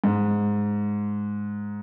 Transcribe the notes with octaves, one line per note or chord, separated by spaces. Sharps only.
G#2